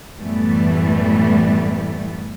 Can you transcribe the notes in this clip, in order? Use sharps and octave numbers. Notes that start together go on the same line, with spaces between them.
F#2 A2 E3 G3 A3 B3